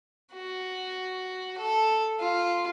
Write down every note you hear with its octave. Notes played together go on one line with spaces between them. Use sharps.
F#4
A4
F4